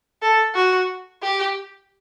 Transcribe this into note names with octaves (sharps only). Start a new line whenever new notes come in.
A4
F#4
G4